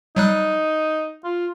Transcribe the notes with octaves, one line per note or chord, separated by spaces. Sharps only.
F#3 G3 D#4 F#6
F4